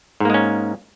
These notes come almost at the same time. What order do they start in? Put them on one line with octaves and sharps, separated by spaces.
G#2 A#3 G#3 C#4